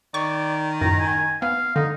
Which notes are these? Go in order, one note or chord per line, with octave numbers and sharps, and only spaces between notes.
D#3 D5 C#6
F#2 A2 A#5
G#5
B3 F5
D3 D#4